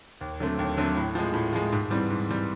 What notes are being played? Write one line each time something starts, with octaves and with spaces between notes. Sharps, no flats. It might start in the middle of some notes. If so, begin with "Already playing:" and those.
D#2
D3 F#3 A3 C4
D#2
D3 F#3 A3 C4
A2
F3 G#3
A2
F3 G#3
G#2
E3 G3 C4
G#2
E3 G3 C4